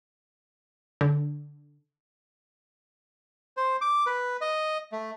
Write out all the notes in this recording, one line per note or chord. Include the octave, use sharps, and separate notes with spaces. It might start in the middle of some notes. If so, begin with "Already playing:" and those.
D3
C5
D6
B4
D#5
A3